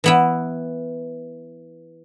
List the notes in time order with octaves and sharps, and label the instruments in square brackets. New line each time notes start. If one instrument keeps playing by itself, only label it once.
[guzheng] E3 B3 E4